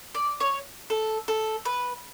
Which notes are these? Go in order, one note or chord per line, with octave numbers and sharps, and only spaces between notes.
D5
C#5
A4
A4
B4